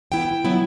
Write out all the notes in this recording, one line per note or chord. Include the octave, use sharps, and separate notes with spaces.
E3 B3 E4 G5
F#3 B3 E4